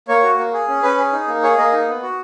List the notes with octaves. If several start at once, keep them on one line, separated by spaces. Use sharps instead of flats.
A#3 C#5
F#4
A#3
G#4
C#4
C#4 B4
G#4
D#4
A#3
G#4 C#5
A#3 D#5
D#4
B3
F#4